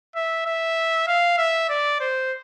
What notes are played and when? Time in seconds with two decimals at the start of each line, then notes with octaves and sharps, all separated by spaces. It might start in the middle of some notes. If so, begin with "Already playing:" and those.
0.16 E5
0.47 E5
1.08 F5
1.38 E5
1.70 D5
2.00 C5